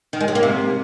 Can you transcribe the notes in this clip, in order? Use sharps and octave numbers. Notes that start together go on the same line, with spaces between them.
D#3
G#3
F#3
A#3
C3